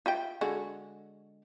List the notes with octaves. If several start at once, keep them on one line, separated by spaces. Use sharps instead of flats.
F4 E5 G5
D3 G#3 F#4